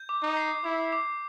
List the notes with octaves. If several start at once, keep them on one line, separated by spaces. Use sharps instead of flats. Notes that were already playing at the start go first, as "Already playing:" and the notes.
Already playing: G6
D6
D#4
C7
E4 D6
D6